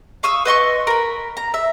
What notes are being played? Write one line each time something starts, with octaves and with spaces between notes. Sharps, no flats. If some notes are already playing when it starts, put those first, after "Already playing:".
F5 C#6 D#6 E6
B4 D#5 C6 C#6
A#4 B5
A#5
E5